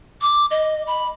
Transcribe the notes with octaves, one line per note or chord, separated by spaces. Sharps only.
D6
D#5
B5